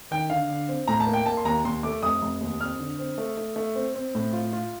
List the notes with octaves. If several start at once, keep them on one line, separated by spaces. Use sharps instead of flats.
D#3 G5
D3 F5
D3
C4
A2 A#5
A5
A#3
G5
A#3 A5
C6
D#2 A#5
D#2 C6
A3 D6
F1 D#6
F1
D#2
F2 F6
D3
C4
A3
A3
A3
C4
C4
A2
F4
F4